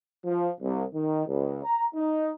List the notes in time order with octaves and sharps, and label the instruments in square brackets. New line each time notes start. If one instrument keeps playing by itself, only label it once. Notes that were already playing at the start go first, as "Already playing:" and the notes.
[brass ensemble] F3
C2
D#3
C#2
A#5
D#4